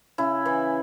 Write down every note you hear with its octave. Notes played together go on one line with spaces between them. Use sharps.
C#3 E4
E3